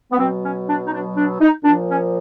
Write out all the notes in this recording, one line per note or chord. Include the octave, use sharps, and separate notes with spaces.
B3
B2 F#3 C4
C#4
D4
D#4
D4
D4
D#4
A#2 F3 D4
C#4